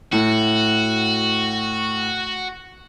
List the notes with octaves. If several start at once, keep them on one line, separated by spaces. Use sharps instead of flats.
A2 F#4